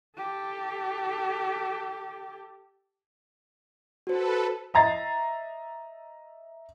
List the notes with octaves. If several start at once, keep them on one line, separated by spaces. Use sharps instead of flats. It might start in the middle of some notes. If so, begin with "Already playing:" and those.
G4 A4
F#4 A4 B4 C5
D#5 E5 A#5 A6 C7